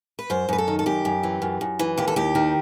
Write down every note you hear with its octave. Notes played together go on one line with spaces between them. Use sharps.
B4
F#2 C5
F#2 B4
A4
D#3
A4
F#2 G4
F#2
E3
F#2
F#2
E3
D#2 G4
A4
D#2 G4
D#3